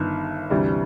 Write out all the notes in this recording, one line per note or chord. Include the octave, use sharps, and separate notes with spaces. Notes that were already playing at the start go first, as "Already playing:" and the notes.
Already playing: G1 G2 D#3
D2 C3 E3 G3